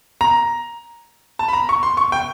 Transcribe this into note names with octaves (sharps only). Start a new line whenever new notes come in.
A#5
A5
B5
A#5
C#6
C6
C#6
G5